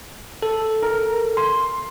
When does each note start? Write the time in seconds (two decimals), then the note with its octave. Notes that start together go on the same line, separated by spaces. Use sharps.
0.43 A4
0.82 A#4
1.37 C6